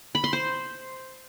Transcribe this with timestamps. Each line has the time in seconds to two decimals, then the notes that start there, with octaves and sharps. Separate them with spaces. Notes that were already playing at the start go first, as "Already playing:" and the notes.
0.15 B5
0.24 C6
0.33 C5